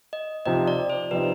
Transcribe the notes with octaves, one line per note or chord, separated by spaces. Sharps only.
D#5
C3 F3 C4 D#4 D#5
D5
C5
C3 F3 C4 D#4 B4